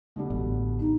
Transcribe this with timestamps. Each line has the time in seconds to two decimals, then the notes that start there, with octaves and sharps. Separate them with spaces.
0.16 B2 D3 G3
0.30 A1
0.80 D#4